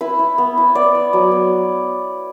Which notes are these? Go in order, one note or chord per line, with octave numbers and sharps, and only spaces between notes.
E4 B4
E4
B3
E4
B3 D5
E4
F#3
B3